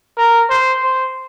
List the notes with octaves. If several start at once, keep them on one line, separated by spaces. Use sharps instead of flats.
A#4
C5
C5